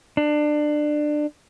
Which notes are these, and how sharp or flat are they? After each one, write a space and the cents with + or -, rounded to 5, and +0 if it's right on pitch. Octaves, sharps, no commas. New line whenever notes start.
D4 +25